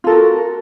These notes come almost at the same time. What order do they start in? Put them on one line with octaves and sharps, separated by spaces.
F4 A4 A#4 F#4